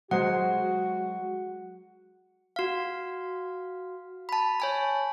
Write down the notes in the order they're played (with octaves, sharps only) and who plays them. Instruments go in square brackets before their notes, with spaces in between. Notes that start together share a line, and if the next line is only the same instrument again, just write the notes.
[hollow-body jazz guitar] F#3 G#3 C5 [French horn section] F#4 [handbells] F#5
[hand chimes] F#4 F5
A5 B5
C#5 G#5 A5